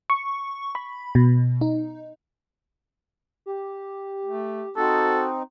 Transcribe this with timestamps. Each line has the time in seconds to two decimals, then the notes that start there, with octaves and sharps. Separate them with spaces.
0.10 C#6
0.75 B5
1.15 B2
1.61 D#4
3.46 G4
4.25 A3
4.77 C4 D#4 F#4 A4